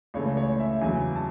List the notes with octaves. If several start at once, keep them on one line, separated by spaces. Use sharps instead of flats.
C#2 C#3 E3 A3 C#5
C#5
E5
E2 C#3 F#3 G#5
A5